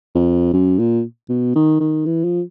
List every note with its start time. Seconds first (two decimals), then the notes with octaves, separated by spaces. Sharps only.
0.15 F2
0.53 F#2
0.79 A#2
1.29 B2
1.55 D#3
1.80 D#3
2.06 E3
2.24 F3